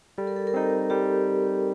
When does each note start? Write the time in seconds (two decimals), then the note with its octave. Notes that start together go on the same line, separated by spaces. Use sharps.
0.18 G3 A4
0.27 A#4
0.36 A4
0.47 A#4
0.54 C4 D#4 A4
0.90 G3 G4